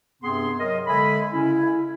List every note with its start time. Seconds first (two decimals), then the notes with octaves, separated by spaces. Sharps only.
0.22 G2 C3 B3 C4 G#4 C6
0.58 F#3 A#4 D#5
0.87 D3 G#3 A4 E5 G#5 B5
1.32 C#3 C#4 E4